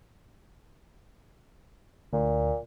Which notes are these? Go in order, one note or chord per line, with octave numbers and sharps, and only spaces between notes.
D2 A#2